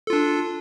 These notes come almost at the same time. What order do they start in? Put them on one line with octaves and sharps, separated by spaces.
A4 F4 D4